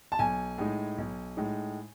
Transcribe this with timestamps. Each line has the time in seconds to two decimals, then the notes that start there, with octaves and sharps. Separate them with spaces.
0.12 A5
0.19 B1 G#5
0.58 A2 G#3 D#4
0.98 B1
1.37 A2 G#3 D#4